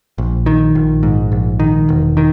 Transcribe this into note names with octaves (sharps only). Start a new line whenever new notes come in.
A#1
D#3
A#1
G#2
A#1
D#3
E1
D#3